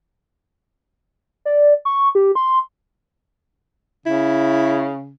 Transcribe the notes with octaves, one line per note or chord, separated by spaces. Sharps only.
D5
C#6
G4
C6
C#3 E4